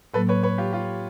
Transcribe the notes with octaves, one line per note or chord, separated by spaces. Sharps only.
A2 F#3 A#3 A4 B4
B4 C#5
B4 C#5
F4 G4
F4 G4